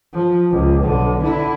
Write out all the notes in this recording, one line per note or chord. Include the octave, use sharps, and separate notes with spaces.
F3
C#2
B1 D3
D3 E4